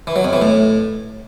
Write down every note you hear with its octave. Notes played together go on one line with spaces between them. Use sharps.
E3
F#3
F2
E3
A2